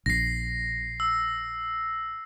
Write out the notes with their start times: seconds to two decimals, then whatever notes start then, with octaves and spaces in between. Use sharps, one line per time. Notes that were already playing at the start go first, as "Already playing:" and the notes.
0.06 A#1 A#6 C7
1.00 E6